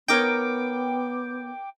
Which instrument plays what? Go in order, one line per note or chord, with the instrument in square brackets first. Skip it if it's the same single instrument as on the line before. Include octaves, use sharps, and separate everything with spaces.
[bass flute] B3 [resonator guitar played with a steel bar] D#4 A#4 C#5 [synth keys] G5 D6